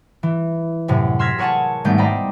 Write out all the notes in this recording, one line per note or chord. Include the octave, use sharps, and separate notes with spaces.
E3
F#2 A2 C3
C6 E6 F6 G#6 A#6 B6
G#4 A#4 C#5 F#5 G#5 A5
G#1 G3 A3 B3 G6
C5 D5 D#5 G5 A#5 B5